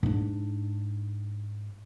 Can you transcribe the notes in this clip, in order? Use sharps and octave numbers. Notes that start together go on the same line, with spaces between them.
G#2 D4